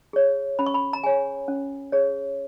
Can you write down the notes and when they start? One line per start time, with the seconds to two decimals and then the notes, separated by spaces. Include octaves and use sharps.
0.13 G#4 C#5
0.59 C#4 B5
0.66 C#6
0.74 B5
0.93 A#5
1.03 G#4 C#5 G#5
1.48 C#4
1.92 G#4 C#5